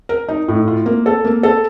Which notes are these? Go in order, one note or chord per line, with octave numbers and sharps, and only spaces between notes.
A#4
D#4
A2
F4
A#3
A4
A#3
A4